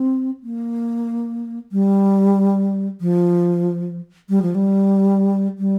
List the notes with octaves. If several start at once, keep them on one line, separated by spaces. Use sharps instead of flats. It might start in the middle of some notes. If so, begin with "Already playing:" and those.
Already playing: C4
A#3
G3
F3
G3
F3
G3
G3